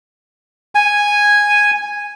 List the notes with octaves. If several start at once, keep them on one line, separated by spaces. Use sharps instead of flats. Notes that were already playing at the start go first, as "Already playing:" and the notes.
G#5